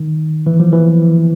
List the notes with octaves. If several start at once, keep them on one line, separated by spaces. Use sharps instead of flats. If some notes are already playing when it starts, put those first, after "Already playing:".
Already playing: D#3
E3
F3
E3